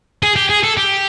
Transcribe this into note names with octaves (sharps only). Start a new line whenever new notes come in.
G#4
G4
G#4
A4
G4